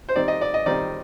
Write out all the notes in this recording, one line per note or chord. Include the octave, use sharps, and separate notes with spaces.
C5
D#3 G3 C4 D#4 D5
D#5
D5
D#5
D#3 G3 C4 D#4 D5